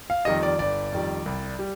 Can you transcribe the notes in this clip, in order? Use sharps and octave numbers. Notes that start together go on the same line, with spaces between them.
F5
F2 D#3 G3 D#5
D5
G1 D5
F2 D#3 G3
C2
G3